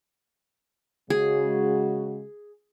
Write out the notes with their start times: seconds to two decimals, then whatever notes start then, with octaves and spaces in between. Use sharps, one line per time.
1.10 C#3 G#3 F#4 G#4